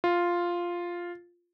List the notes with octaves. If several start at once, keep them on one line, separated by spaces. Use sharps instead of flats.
F4